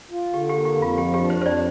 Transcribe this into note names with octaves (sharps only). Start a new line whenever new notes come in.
F4
D3 G4
G4
A#3
G4
F2
F4
F3 G4
G4
D4
C5
F2 C5 D5